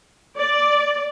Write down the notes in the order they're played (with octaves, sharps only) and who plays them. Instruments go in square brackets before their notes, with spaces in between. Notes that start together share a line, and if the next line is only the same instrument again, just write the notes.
[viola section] D5